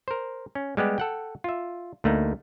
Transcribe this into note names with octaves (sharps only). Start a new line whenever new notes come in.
A#4 C5
C#4
G3 G#3 B3 G4
A4 F#5 G5
F4 E5
D2 A3 A#3 D#4